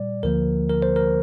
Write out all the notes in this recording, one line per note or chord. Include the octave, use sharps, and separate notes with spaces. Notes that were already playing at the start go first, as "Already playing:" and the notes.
Already playing: A#2 G3 D5
D2 D3 F3 A#3 A#4
A#4
C5
A#4